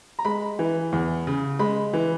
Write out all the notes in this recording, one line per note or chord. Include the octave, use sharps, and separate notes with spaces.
A#5
G#3 B5
E3
E2
C#3
G#3 B5
E3